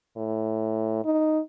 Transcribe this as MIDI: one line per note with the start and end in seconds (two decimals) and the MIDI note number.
0.17 1.03 45
1.05 1.40 63